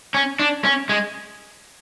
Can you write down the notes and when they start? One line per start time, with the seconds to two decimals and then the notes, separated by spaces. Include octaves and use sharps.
0.14 C#4
0.39 D4
0.65 C#4
0.89 G#3